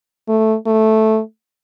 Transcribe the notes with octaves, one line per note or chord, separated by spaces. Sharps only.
A3
A3